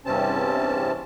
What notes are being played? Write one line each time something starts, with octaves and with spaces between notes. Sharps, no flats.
E2 G2 C3 C4 C#4 A5